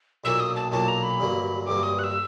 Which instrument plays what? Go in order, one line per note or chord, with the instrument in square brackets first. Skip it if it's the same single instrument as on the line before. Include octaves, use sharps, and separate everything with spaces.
[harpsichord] B1 A#2 F#3 A#3 D4 [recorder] E6
[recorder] D#6
A5
[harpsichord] B1 A#2 F#3 A#3 D4 [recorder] A5
[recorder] A#5
B5
[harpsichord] A1 G2 D3 F#3 A#3
[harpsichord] A1 G2 D3 F#3 A#3 [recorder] D6
[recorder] D#6
F#6
E6